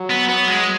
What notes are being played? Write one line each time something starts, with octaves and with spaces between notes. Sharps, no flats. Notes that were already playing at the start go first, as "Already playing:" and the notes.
Already playing: F#3
B3
B3
G#3